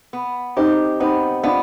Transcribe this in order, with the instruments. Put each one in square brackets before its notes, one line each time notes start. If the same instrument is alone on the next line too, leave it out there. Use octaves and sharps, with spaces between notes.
[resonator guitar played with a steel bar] B3
[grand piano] C4 D#4 [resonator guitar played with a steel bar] G4
[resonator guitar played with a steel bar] B3 [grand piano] C4 D#4
[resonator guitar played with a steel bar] B3 [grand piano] D4 F4